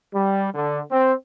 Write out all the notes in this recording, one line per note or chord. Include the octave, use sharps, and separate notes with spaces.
G3
D3
C4